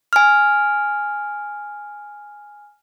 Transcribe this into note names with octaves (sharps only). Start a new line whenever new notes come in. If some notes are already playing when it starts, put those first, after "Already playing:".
G#5 F6